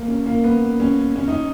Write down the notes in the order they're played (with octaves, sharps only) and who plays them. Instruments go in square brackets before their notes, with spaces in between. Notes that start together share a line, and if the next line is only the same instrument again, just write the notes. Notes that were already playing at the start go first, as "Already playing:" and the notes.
Already playing: [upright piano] A#3
C#4
A#3
B3
C#4
C#4
D#4